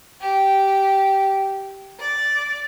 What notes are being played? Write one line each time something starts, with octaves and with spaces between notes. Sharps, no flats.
G4
D5